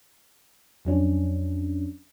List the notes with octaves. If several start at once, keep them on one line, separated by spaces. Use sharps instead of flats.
F2 F#3 C#4 D4